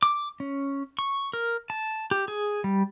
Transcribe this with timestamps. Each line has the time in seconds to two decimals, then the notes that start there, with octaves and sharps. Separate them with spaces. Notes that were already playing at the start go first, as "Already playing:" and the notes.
0.03 D6
0.40 C#4
0.99 C#6
1.33 A#4
1.70 A5
2.11 G4
2.28 G#4
2.64 G3